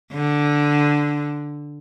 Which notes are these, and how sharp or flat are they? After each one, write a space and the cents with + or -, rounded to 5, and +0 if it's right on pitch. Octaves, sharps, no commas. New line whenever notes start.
D3 +0